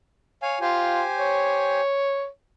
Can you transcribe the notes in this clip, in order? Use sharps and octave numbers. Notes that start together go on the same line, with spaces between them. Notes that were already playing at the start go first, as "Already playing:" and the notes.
C#5 F5 G#5
F4 G4 C5 G#5
C#5